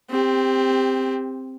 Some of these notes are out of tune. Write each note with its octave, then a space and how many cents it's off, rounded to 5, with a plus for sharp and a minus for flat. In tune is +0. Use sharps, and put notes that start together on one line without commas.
C4 +0 G4 +25